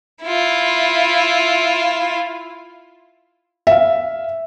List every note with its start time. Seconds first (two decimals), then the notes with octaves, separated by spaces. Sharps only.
0.23 E4 F4
3.67 E5 F5